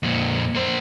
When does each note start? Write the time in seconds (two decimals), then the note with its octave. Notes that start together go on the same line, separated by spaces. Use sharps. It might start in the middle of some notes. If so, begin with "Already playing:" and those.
0.03 F2 A#2
0.55 A#3 C5